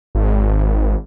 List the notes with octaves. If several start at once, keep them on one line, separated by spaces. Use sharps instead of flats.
G#1